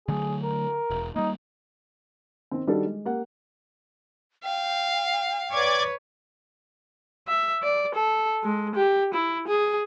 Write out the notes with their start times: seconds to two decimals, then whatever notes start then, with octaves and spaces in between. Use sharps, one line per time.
0.08 D3 F#3 A3 G#4
0.43 A#4
0.90 E1
1.16 G3 A#3 D#4
2.51 D#3 C4
2.67 D#3 G3 D4 D#4 F#4 A4
2.86 G#3
3.05 A#3 G4 F#5
4.44 F5 G5
5.52 B4 C#5 D5 D6 G#6
7.28 E5
7.63 D5
7.95 A4
8.44 G#3
8.75 G4
9.14 E4
9.48 G#4